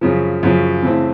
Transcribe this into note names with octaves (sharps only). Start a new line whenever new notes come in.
F#2 C#3 F3
F#2 C#3 F3
C#3 E3 A3 C4